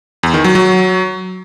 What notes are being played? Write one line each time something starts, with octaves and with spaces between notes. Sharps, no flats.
E2
D#3
F#3
F#3